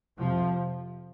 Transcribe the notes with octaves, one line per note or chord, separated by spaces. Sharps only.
F2 C3 F3